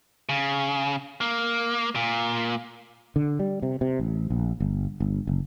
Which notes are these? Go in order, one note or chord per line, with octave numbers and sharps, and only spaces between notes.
C#3
A#3
A#2
D3
G3
C3
C3
A1
A#1
G1
G1
F#1